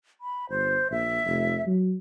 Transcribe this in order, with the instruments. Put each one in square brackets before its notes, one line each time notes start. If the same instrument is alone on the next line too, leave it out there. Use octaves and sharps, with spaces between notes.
[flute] B5
[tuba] G1 [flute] C5
[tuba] A#1 [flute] E5
[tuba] F1
F#3